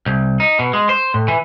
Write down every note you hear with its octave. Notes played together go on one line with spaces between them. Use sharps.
C2
D#4
B2
G#3
C5
A2
E3